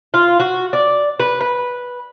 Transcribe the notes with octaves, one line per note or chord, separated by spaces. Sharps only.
F4
F#4
D5
B4
B4